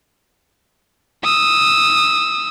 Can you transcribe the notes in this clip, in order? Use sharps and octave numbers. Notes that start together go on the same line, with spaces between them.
D#6 E6